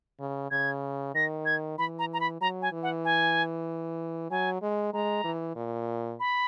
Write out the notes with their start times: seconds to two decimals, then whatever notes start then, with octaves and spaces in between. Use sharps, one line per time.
0.20 C#3
0.51 C#3 G#6
1.15 D#3 A#6
1.46 G#6
1.78 E3 B5
1.99 A#5
2.13 A#5
2.20 B5
2.41 F#3 A#5
2.62 G#5
2.72 E3
2.83 F#5
3.05 G#5
4.31 F#3 G#5
4.62 G#3
4.93 G#3 A#5
5.24 E3
5.56 A#2
6.20 B5